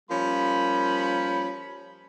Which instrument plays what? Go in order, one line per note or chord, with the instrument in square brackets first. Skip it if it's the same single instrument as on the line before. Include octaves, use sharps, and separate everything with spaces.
[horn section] F3 G3 A#3 C#4 B5